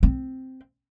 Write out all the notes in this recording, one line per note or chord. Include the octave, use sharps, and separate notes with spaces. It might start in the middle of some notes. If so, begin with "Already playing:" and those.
C4